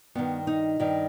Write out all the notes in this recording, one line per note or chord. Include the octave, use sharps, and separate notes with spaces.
G2 D#3 B3
D#4
G2 D#3